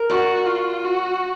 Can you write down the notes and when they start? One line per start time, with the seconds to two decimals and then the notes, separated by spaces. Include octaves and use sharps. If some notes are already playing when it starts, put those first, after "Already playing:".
Already playing: A#4
0.10 F#4 D5
0.47 F4
0.85 F#4